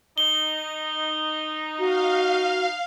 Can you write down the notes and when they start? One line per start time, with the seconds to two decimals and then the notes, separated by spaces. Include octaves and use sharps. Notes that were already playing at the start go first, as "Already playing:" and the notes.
0.18 D#4 G7
1.79 F#4 F5